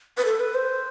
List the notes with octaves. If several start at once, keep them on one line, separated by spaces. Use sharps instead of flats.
B4
A4
B4
C5